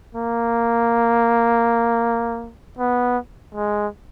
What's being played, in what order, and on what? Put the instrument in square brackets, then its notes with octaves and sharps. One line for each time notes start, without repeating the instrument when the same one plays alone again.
[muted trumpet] A#3
B3
G#3